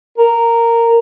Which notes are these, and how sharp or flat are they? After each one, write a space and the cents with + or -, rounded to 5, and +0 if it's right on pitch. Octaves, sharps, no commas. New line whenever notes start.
A#4 -10